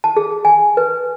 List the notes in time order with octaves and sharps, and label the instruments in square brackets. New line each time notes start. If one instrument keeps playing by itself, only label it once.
[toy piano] A5
G#4
G#5
B4